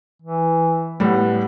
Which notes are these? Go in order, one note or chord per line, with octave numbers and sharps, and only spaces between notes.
E3
A2 G3 B3